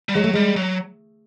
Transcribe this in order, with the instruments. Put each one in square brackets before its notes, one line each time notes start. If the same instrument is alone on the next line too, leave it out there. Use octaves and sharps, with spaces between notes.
[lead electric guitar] G3
[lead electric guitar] F#3 [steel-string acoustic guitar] G#3
[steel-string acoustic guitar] A3
[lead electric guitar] G3 [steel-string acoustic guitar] G#3
[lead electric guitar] F#3